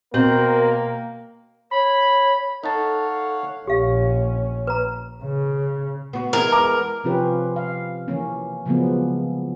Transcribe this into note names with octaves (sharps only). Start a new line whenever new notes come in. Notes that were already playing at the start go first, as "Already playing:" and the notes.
B2 A#3 C4 A#4 F#7
C#5 B5
D#4 A4 C#5 F5 F#5 A5
A#1 C#4 G4 F5
B4 A#5
C#3
B3 F#4
E3 G#3 B3 A#4
A#5 D6 F6
C3 F3 C#4 F4 G4 B4
F5
E3 A#3 C#4
C#3 F3 F#3 G#3 A#3 B3